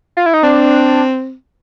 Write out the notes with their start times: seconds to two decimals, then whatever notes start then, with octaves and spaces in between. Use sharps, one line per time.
0.17 F4
0.26 E4
0.34 D#4
0.43 C4 D4